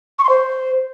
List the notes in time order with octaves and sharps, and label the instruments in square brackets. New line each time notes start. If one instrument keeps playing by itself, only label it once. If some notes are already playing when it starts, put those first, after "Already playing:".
[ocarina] C#6
C6
C5